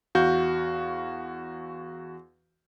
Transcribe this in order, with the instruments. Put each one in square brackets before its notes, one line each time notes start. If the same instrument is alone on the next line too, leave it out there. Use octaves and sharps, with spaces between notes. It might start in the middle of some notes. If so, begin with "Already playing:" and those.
[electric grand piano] E2 F#4 F5 G6